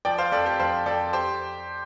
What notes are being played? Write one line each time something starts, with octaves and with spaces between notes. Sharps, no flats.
F3 D5 G5
C5 F5
F2 A4 D5
G4 C5
F2 C5 F5
F2 A4 D5
G4 C5